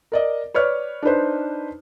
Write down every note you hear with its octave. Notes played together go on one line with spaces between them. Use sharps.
A#4 D5 D#5
B4 C#5 D5 F6
D4 D#4 B4 C5